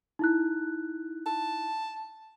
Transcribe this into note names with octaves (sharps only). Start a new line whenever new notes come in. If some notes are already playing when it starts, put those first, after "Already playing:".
D#4 E4 F#6
A5